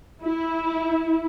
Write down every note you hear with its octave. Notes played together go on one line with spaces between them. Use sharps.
E4